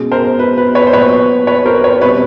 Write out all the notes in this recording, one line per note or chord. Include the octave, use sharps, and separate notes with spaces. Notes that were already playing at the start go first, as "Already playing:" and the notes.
Already playing: B2 G#3 C#4
A#4 C5
B4
B4
B4 C#5
C5
A#2 F#3 B3 B4 C#5
B4 C#5
A#4 C5
B4 C#5
B2 G3 C4 B4 C#5